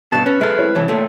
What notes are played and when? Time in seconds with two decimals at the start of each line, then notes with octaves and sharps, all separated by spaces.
0.12 G2 B2 A5 E6 F#6
0.26 C#4 B4
0.41 G#3 A4 E5 F6
0.58 C4 E4 C#5
0.75 C2 E3 C#5 A5
0.88 A#2 A3